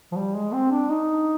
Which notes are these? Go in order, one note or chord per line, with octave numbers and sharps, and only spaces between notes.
F3
G3
G#3
C4
D4
D#4